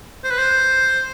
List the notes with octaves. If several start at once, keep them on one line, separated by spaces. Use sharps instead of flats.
C5
B4
C5